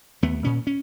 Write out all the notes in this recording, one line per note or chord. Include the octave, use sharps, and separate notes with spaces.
D#2 A3 B3
A#2 C#4
C#4